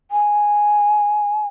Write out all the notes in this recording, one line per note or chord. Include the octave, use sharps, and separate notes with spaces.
G#5